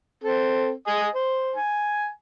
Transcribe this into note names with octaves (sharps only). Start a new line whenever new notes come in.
C4 A4
D#5 G#5 D#6
C5
G#5